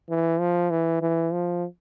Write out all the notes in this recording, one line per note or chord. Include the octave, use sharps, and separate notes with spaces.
E3
F3
E3
E3
F3